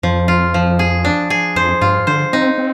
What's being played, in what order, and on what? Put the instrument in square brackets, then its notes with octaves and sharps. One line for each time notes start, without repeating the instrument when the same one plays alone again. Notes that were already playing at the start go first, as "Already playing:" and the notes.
[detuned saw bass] F2 [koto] F3
[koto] F4
F3
G#4
D4
G#4
[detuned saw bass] F2 [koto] C5
[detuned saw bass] G2 [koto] F4
[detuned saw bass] D3 [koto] C5
[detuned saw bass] C4 [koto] D#4
[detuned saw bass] C4